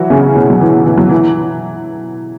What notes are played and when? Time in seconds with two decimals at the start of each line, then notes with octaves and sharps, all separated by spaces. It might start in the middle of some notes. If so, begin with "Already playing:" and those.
Already playing: E3 F#3 E4 F#4
0.10 C#3 C#4
0.35 B2 B3
0.50 F#3
0.61 E3
0.86 E3
0.98 F#3
1.09 E3